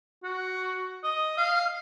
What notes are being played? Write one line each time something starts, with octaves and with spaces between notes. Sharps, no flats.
F#4
D#5
F5